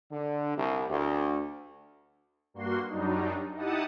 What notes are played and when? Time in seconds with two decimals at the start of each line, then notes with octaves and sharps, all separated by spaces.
0.11 D3
0.57 C2
0.89 D2
2.54 G2 A#3 F#4 C6
2.88 F#2 F#3 G3 D4 D#4
3.55 D#4 E4 G4 F#5 A5 D#6